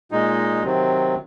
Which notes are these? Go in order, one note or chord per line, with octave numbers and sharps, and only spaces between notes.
A#2 G#3 D#4
C3 D#3 F#3 C4